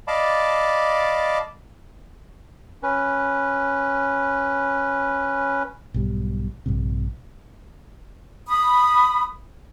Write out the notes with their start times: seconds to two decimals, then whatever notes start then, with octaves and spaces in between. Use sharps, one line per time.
0.08 D5 D#5 F5 A5 B5 D6
2.83 C#4 B4
5.94 B1 G#2 B2 G3
6.66 A#1 G2 C3
8.49 B5 D#6